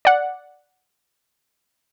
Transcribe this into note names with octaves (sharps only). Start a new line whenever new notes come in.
D5 F#5